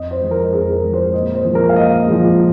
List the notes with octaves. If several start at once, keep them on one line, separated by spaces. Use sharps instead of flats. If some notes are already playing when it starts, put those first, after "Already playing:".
Already playing: F2 D#5
C5
F3 G#3
A#4
F2 G#4
A#4
F3 G#3
C5
A#2 D#5
C5
F3 G#3
A#4
F5
A#2 D#5
F3 G#3